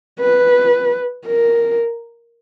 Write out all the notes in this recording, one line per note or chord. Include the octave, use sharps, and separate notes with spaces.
B4
A#4